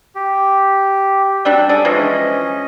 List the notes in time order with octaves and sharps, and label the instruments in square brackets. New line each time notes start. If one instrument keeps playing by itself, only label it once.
[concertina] G4
[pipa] F#3 G3 D4 [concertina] E6
[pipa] D4 G#4 [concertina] A4
[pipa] E3 F3 G#3 [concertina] C#4 D#5